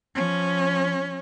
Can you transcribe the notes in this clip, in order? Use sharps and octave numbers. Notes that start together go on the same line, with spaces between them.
F3 C#4